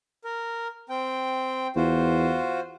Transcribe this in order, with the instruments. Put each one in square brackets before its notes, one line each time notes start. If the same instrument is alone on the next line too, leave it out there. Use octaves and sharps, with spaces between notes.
[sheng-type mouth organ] A#4
C4 G5
[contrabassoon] E2 [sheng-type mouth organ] F4 F#4 C5